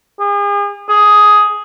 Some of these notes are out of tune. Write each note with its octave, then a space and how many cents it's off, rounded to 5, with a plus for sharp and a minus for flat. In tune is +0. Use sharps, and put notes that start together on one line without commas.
G#4 -40
G#4 +10